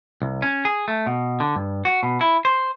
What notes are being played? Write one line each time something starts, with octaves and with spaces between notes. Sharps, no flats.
C2
C#4
G#4
A3
B2
D3
G2
F#4
B2
E4
C5